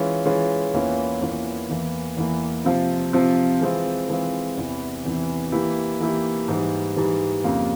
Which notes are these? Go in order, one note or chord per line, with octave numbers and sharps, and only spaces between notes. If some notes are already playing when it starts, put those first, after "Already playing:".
Already playing: E3 G#3 C#4 F4
E3 G#3 C#4 F4
E2 E3 A#3 C#4 F4
E2 E3 A#3 C#4 F4
E2 E3 A#3
E2 E3 A#3
C3 F3 C4 F4
C3 F3 C4 F4
E3 G#3 C4 F4
E3 G#3 C4 F4
E2 C3 E3
E2 C3 E3
E3 A#3 E4 G4
E3 A#3 E4 G4
G#2 E3 G3
G#2 E3 G3
F2 C#3 G3 A#3 F4